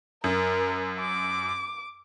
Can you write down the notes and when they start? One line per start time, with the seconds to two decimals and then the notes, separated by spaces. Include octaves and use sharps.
0.24 F#2 A#4
1.00 D6